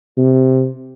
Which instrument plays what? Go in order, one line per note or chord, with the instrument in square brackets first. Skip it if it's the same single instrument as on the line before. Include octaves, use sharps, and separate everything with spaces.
[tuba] C3